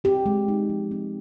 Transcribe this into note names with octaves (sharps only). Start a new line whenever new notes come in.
C4 G4
G#3
D#4
F3
C4